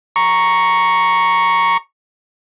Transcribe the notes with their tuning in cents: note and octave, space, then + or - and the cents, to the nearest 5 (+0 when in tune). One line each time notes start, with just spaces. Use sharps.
A#5 +0 C#6 +0